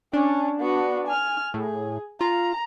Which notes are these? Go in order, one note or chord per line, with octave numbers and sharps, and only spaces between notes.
C#4 D4
B3 F#4
G#5 F6
A2 G#4
F4 A#5